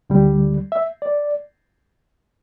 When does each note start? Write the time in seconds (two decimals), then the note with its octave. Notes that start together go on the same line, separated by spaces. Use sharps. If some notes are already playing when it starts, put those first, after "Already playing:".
0.10 D2 D3 G3
0.72 E5
1.02 D5